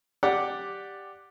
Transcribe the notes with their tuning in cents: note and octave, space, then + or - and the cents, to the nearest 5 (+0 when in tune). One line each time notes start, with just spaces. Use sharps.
G4 +5 D5 +0 F#5 +0